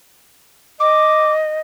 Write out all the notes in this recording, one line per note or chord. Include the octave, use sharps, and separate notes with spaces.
D#5 D6